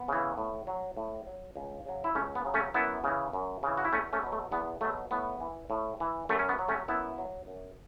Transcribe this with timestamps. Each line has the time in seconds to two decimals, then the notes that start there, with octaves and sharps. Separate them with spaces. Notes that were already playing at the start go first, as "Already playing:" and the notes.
Already playing: B3
0.08 C#3 E3
0.38 A2
0.67 F#3
0.97 A2
1.26 F#3
1.56 C#2
1.86 C#3 F#3
2.04 E4
2.15 C#2 A3 C#4
2.35 B3
2.45 C#3 F#3
2.54 A3 C#4
2.74 F#2 B3 E4
3.04 C#3 E3
3.33 F#2
3.63 C#3 E3
3.78 F#4
3.85 E4
3.92 E2 A3 C#4
4.13 A3 C#4
4.23 B2 F#3
4.32 A3
4.51 E2 B3
4.81 B2 F#3 A3
5.11 A2 B3
5.40 E3
5.70 A2
6.00 E3
6.29 F#2 A3
6.39 C#4
6.49 B3
6.59 F#3
6.68 A3 C#4
6.88 F#2 B3 E4
7.18 F#3
7.47 F#2